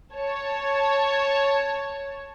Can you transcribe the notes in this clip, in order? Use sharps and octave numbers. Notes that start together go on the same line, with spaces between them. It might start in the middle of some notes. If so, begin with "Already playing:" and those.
C#5 A5